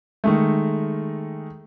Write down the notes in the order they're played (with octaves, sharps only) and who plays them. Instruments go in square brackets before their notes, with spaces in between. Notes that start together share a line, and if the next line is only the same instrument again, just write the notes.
[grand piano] D#3 G#3 A3